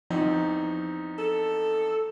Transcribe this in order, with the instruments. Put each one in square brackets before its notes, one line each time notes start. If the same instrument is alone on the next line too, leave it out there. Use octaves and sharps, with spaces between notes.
[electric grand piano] E2 C4 D#4 [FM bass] F3
[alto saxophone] A4